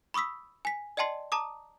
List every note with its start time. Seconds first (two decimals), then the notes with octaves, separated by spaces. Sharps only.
0.14 B5 C#6 D#6 E6 B6
0.65 G#5 B6
0.97 D5 D#5 G5 A5 C6 C7
1.32 A5 A#5 D6 D#6